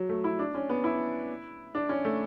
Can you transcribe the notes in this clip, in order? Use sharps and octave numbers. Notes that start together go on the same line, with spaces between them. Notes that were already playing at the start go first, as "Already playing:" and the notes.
Already playing: F#3
A3
E4
D4
C#4
B3
E4
D4
C#4
A3